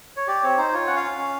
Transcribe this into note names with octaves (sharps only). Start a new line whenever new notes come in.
C#5
G4 D5
C4 C#5
D#4 C5
F4 C#5
C#4 F#5
F5
C#4
C#4